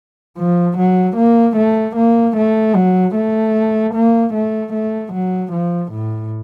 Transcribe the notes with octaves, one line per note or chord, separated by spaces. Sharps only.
F3
F#3
A#3
A3
A#3
A3
F#3
A3
A#3
A3
A3
F#3
F3
A2